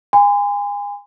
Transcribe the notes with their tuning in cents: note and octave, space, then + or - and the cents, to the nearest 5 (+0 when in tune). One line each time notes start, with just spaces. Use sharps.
G#5 -30 C6 -40